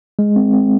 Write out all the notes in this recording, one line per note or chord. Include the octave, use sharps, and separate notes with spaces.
G#3
C4
C4